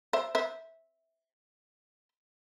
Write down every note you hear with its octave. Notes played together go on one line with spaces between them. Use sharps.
C5 E5
C5 E5